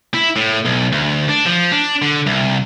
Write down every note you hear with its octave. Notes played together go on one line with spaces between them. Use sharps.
E4
A2
B1
D2
D4
F3
D4
D3
C2